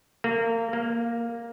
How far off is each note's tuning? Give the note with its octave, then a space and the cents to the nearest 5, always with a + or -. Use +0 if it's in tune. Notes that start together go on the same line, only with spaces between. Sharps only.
A#3 -30
A#3 +0